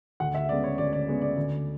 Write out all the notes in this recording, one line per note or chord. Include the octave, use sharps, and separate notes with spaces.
D2 F#5
E5
C#3 G#3 B3 D5
C#5
D2 D5
D5
C#3 G#3 B3
D5
D2